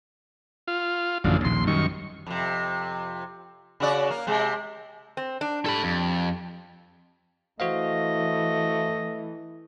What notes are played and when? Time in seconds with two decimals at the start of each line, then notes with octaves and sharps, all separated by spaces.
0.68 F4
1.24 A1 F#2 D3 F3
1.44 A#1 D#2 A#2 C6
1.67 F#2 D#3 G3 C#6
2.26 F2 C3
3.80 C#3 F#4 D5
4.10 A#3
4.27 C3 G#3
5.17 C4
5.41 D4
5.66 G3 A4 B5
5.84 F2
7.60 E3 A3 F#4 C5 D#5 F5